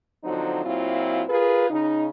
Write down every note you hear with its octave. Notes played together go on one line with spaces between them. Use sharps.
D3 F3 F#3 C4 D#4
A#2 F#3 C4 E4 F4
F4 G#4 A#4 B4
C#3 D#4